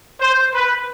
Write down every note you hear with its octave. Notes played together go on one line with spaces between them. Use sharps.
C5
B4